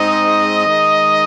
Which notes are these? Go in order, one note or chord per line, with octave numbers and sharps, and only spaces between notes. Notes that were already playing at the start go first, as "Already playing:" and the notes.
Already playing: G#2 G#3 C4 D#4 D#5
D#3 G#3 D#4